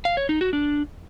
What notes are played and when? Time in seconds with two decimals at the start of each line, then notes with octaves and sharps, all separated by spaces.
0.05 F5
0.17 C#5
0.29 D#4
0.41 F#4
0.53 D4